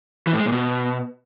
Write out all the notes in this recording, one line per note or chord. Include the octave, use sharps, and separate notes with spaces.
E3
A2
G#3
A#2
B2